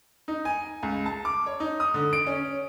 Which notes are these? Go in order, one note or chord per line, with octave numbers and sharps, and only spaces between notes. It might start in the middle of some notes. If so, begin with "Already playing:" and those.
D#4
G#5
C#2
A5
D6
C#5
D#4
D#6
D3
D7
C#4